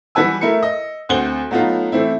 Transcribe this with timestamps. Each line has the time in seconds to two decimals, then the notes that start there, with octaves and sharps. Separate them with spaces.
0.15 E3 G3 F#4 B4 G#5 E6
0.41 A3 E4 A#4 C#7
0.62 D#5
1.09 D2 C4 F#4 G7
1.51 F#3 A3 B3 D#4 F4
1.92 E3 A3 C4 E4